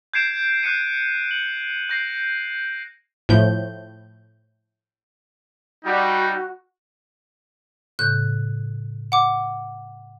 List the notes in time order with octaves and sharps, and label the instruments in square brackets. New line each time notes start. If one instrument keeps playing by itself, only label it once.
[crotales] G6 G#6 C7 D7 E7
F#6 G6 C7 C#7 D#7
F#7
G6 A#6 C7 D7
[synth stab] A2 F3 A3 G6
[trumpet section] G3 [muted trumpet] D#4 [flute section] F#4
[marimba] A2 C#3 G6 [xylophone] F#6
[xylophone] F#5 D6